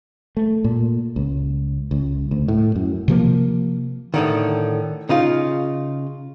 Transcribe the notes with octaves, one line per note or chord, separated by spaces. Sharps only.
A3
A#2
C#2
C#2
D2
A2
F#2
C3 F3 A#3
A2 D3 D#3
C#3 D#4 F4